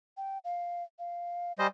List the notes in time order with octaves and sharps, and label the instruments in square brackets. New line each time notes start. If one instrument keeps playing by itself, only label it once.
[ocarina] G5
F5
F5
[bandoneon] G3 C5 D#5 [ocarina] G#5